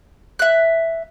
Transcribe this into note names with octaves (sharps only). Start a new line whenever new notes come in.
E5 F#6